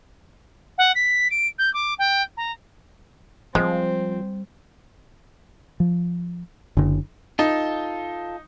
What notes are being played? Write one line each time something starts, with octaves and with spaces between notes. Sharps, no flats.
F#5
B6
D7
G6
D6
G5
A#5
F3 G3 G#3 C4
F3
F#1 D3
D#4 F4 A4